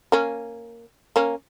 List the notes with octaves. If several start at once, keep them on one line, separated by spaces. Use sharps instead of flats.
A#3 C#4
A#3 C#4